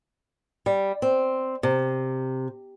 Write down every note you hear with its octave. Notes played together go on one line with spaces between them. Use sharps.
G3
C4
C3